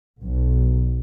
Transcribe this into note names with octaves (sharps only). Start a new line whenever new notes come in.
B1